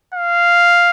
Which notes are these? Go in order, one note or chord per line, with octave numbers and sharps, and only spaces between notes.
F5